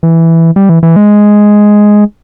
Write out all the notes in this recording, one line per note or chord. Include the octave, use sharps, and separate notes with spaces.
E3
G3
E3
E3
G#3